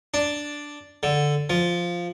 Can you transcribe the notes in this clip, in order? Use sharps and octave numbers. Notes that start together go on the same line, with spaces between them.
D4
D3
F3